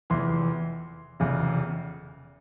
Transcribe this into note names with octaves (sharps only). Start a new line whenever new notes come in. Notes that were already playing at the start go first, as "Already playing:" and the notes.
F1 E2 E3 C6
F1 E2 C#3